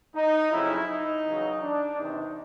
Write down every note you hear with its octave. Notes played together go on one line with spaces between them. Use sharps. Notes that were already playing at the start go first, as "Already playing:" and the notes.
D#4
F2 C#3 F#3 E4
D#4
E2 C#3 F#3
D4
E2 C3 D#3 D#4